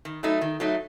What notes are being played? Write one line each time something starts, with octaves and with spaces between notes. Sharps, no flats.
D#3
F#3 A3 D#4
D#3
F#3 A3 D#4